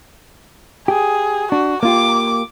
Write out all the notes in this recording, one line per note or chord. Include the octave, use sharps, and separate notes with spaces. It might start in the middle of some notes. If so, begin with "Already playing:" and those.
G4 G#4
D4 F#4
A#3 F4 G4 D6